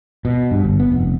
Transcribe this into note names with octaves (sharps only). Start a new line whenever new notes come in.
B2
G2
G1
B3
F1